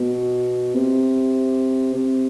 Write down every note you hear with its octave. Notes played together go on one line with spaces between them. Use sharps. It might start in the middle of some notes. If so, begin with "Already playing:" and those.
Already playing: B2
C3
C3